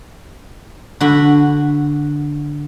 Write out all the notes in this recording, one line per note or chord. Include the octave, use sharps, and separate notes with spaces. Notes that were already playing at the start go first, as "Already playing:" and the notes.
D3 F#4 B5